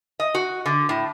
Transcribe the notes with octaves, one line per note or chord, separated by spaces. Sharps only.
D#5
F#4
D3
A2